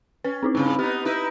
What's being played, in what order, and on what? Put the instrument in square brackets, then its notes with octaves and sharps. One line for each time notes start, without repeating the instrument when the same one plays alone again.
[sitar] C#4 [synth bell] B4
[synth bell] C4 D#4 E4
[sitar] G2 C#3
[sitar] B3 D#4 [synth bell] G4
[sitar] D#4 E4 B4